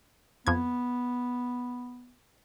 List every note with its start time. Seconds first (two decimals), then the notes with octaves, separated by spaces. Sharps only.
0.47 F2 B3 G#6